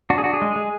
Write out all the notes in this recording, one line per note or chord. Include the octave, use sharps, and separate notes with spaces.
D4 F#4
G#4
D4 F#4
G#4
G#3
G#3